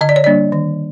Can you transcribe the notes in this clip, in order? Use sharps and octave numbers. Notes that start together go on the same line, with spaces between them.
D3 D#5
D5
C#5
G3 A#3 D4 D5
D#3